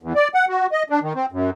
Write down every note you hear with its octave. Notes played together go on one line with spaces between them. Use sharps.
E2
D5
F#5
F#4
D#5
D4
D#3
C4
F#2